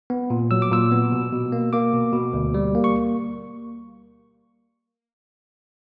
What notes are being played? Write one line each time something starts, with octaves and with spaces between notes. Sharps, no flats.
B3
A#2
F#3 E6
D6
A#2 E6
B3
B2
B2
A#3
A#3 D6
B2
B2
D2
G3
A#3
C#6